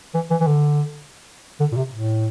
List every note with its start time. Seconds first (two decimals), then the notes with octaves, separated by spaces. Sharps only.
0.15 E3
0.31 E3
0.41 E3
0.47 D3
1.60 D3
1.72 A#2
1.77 C3
1.94 A2